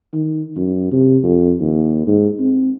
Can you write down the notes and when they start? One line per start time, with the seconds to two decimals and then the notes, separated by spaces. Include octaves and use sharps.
0.13 D#3
0.57 F#2
0.92 C3
1.23 F2
1.60 D#2
2.07 G#2
2.39 C4